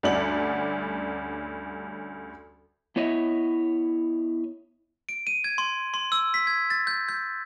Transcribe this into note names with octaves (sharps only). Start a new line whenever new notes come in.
D2 G2 C#4 D5 F#5 F#7
B3 E4 C#5 D#5 E5
D7
D#7
G#6
C6
C6
E6
B6
G#6
A6
G6
G6